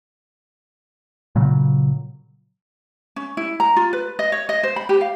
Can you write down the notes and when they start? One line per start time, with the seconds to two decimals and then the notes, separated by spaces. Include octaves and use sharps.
1.36 A#2 C#3 F#3
3.16 C#4
3.37 E4
3.60 A#5
3.76 F4
3.93 B4
4.19 D#5
4.32 C#5
4.49 D#5
4.63 C5
4.76 B5
4.89 G4
5.01 F5